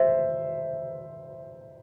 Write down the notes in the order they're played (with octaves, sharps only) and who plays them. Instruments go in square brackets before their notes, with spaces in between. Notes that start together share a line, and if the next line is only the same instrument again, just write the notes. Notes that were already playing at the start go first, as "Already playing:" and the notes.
Already playing: [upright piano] C5 E5